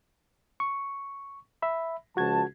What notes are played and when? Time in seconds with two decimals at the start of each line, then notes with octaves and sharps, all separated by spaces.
0.60 C#6
1.62 E5 B5
2.17 C#2 F3 F#4 A5 G#6